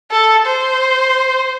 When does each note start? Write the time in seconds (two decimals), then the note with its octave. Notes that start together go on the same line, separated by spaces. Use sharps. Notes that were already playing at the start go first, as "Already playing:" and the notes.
0.11 A4
0.46 C5